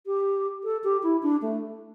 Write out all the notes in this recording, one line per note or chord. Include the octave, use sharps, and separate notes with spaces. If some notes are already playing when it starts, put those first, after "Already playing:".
G4
A4
G4
E4
D4
A3